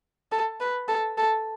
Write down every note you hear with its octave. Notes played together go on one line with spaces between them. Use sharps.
A4
B4
A4
A4